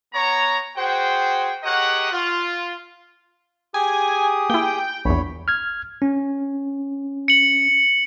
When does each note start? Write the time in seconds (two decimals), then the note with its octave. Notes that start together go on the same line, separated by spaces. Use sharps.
0.13 B3 C#5 A#5
0.77 F#4 G#4 C5 G5
1.64 G4 G#4 A#4 C#5 D#5 F#5
2.11 F4
3.74 G4 G#4 G#5 D#6
4.50 A#3 E4 G5
5.05 A#1 E2 C#5 B5
5.48 F6 G#6
6.02 C#4
7.28 C#7 F#7